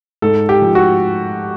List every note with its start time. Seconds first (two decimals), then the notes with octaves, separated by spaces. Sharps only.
0.22 G#2 A4
0.49 G4
0.62 F3
0.75 F#4